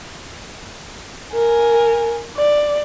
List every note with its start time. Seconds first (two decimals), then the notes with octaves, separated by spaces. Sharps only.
1.35 A#4 G#5
2.36 D5